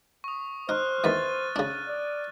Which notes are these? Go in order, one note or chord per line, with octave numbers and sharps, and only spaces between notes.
C#6 D#6
D#4 C5 F6 F#6
E2 D#3 E3 A6 D#7
C#3 D4
D5